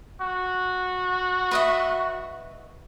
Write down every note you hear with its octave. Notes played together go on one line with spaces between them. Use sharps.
F#4
B4 D#5 E5